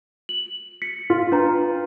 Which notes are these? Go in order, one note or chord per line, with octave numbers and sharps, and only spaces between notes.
F#7
B6 C#7
F4
D4 B4 A#5